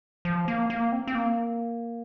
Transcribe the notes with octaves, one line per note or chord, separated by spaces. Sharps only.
F3
A#3
A#3
C4
C4
A#3